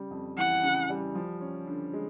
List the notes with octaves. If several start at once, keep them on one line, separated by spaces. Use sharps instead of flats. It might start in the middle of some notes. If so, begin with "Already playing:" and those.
Already playing: C#3 G3
F2
E3 F#5
C#3
G3
F3
C#4
D3
G#3